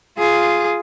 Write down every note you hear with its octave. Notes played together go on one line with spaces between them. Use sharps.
F4 G#4